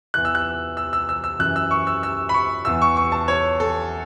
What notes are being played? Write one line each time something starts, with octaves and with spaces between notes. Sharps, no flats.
E2 E3 F#6
E6
F#6
E6
E6
E6
E6
F#2 E3 F#6
E6
C#6
E6
E6
B5
C#6
E2 E3 E6
C#6
C#6
A5
C#5
A4